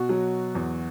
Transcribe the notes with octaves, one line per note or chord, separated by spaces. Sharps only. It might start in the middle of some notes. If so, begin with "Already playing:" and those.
Already playing: B2 F#4
F#3
E2